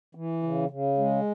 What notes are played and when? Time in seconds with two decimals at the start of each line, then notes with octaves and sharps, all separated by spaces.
0.15 E3
0.43 C#3
0.70 C#3
0.98 G#3